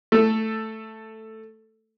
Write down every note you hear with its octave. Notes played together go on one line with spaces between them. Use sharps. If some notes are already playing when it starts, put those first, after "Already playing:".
A3 A4